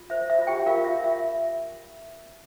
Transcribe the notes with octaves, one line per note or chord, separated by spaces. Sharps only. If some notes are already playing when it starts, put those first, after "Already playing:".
Already playing: F4
C5 E5
E5
F4
G4 G5
F4 A#4 F5
E5
F4
E5